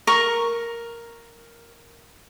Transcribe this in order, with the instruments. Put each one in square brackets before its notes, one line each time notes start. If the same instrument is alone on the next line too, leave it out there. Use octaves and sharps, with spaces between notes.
[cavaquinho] A#4 C#6